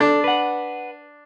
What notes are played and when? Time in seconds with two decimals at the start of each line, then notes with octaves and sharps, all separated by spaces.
0.01 D4 A4
0.24 B4 F#5